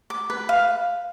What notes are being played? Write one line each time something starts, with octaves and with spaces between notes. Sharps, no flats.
D6
B4
F5